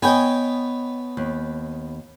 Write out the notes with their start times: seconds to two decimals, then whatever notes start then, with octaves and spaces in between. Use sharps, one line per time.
0.02 B3 B4 C#5 D#5 G5 G#5
1.17 D#2